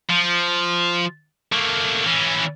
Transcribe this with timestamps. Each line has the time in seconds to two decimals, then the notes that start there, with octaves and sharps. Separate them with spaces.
0.10 F3
1.52 A3 A#3
2.06 E3 C#4